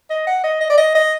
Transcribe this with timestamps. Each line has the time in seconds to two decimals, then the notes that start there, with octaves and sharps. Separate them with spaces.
0.10 D#5
0.27 F#5
0.44 D#5
0.61 D#5
0.70 D5
0.78 D#5
0.95 D#5